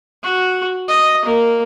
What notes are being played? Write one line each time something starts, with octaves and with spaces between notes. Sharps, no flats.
F#4
D#5
A#3